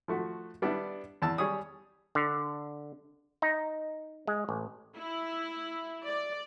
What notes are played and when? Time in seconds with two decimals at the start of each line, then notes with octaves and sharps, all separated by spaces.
0.08 F3 A3 F#4
0.62 G3 B3 D4 E4
1.22 E2 A5 E6
1.38 G3 G#4 C#5 D#6
2.15 D3
3.42 D#4
4.27 G#3
4.49 A1
4.96 E4
6.04 D5